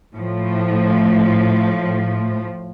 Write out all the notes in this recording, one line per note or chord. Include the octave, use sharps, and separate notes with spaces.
A2 F3